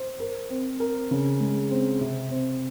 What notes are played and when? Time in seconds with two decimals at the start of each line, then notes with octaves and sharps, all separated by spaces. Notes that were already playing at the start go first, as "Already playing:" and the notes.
Already playing: C5
0.20 A#4
0.50 C4
0.80 A#4
1.11 C#3
1.40 G#3
1.71 C4
2.01 C3
2.31 C4